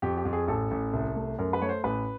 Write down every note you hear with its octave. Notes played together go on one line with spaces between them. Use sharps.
F2 G4
G4
F2
G#4
A1 A4
A1
C2
A3
F#2 A#4
B4
A3 C#5
C5
A1 B4